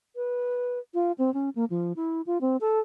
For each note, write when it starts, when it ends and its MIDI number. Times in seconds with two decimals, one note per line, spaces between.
0.16 0.79 71
0.94 1.12 65
1.18 1.33 60
1.34 1.49 61
1.55 1.65 58
1.70 1.93 53
1.96 2.21 64
2.26 2.38 65
2.41 2.57 60
2.61 2.80 69